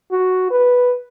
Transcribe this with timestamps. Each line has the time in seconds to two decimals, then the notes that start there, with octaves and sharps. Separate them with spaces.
0.12 F#4
0.51 B4